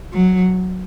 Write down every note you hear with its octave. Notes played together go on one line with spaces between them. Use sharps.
F#3